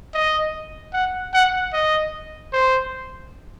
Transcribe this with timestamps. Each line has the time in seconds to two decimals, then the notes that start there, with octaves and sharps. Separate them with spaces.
0.14 D#5
0.93 F#5
1.34 F#5
1.73 D#5
2.53 C5